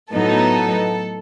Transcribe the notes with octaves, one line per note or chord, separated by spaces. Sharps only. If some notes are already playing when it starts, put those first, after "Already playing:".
A2 F#3 B3 D#4 A4